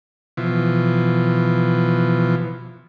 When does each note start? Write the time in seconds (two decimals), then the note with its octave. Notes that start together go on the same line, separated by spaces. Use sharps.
0.37 B2 E3 F3